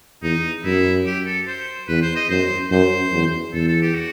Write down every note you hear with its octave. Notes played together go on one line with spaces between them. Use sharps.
E2 D#4
F#2 E4
G4
A4
C5
E2 B4
C5
D#5
F#2 C5
F#2 C5
E2
E2 A4
A4
G4
F#4